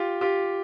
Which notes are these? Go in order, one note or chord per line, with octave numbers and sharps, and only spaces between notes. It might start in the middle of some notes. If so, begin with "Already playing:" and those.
Already playing: F4 G4
F4 G4